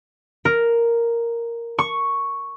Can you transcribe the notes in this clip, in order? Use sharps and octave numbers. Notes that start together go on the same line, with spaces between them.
A#4
C#6